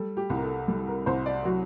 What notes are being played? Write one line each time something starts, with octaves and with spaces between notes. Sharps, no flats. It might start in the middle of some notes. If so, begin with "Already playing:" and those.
Already playing: G3 A4
G4
C2
A#4
A4
G3 A4
A#4
C2 C5
D5
F#3 F#4